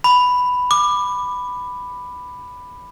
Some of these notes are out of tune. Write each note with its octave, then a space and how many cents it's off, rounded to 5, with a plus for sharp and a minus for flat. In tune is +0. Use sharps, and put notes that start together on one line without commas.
B5 +5
D6 +20